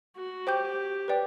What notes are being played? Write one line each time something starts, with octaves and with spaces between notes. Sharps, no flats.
F#4
G4 C5 G5 D6 G6
B4 D5 G5